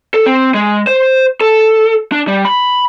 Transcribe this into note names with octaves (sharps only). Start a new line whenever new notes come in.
A4
C4
G#3
C5
A4
D4
G3
B5